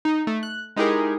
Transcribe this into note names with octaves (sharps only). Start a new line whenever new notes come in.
D#4
A3
F#6
G#3 D#4 E4 G4 G#4 A#4